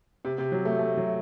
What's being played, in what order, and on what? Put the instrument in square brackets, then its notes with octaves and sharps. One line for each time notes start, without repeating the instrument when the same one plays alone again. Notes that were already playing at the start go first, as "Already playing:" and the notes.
[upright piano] C3
C3
F#3
A3
A3
F#3